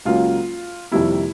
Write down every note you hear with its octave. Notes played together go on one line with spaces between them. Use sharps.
C#2 C#3 F#3 A#3 F4
F2 C3 D#3 G3 A#3 E4